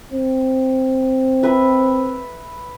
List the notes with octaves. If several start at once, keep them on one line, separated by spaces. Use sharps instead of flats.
C4
B4 E5